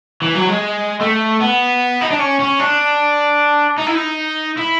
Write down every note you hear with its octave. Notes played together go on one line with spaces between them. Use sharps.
E3
F#3
G#3
A3
B3
D#4
D4
C#4
C#4
D4
D#4
E4
D#4
E4